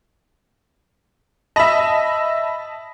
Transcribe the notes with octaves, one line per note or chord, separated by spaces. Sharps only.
D#5 E5 A5 B5 A#6